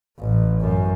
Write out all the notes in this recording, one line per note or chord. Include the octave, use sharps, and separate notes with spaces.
A1
F#2